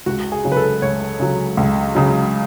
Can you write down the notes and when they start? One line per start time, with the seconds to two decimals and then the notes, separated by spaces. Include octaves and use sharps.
0.06 C#2 F#4
0.32 G#4
0.44 C#3 F#3
0.52 B4
0.57 A4
0.82 C#2 C#5
1.20 C#3 F#3
1.57 C#2
1.95 C#3 F#3